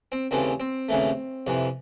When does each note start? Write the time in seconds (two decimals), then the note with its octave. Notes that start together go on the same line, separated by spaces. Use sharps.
0.12 C4
0.31 D#2 C#3 E3 A3 C4
0.60 C4
0.89 D#2 C#3 E3 A3
1.47 F2 C3 E3